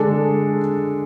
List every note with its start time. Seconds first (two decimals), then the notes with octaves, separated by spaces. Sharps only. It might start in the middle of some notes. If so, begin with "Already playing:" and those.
Already playing: D3 G#3 D4 A4